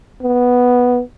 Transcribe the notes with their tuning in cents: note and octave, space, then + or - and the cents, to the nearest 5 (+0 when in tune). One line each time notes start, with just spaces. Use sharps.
B3 -5